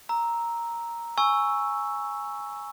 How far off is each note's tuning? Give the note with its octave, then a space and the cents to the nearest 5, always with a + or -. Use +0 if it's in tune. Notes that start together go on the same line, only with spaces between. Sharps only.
A#5 +0 E6 -10
G#5 +0 C#6 +0 E6 +0